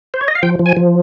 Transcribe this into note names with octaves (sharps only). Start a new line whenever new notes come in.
C5
C#5
D#5
F5
F3 G5
F3
G#5
F3